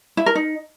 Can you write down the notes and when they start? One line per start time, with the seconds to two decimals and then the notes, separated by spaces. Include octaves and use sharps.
0.17 E4
0.26 A#4
0.35 D#4